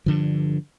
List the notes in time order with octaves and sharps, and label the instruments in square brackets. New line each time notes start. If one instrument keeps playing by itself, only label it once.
[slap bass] G2 D3 F3